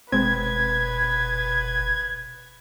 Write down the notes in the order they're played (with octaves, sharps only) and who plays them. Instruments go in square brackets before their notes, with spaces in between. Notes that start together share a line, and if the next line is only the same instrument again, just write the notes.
[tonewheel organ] F#1 B2 [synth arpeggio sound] G#3 C4 [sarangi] B4 [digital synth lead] G#6